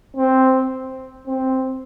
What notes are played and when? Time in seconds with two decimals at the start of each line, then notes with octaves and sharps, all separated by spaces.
0.17 C4
1.26 C4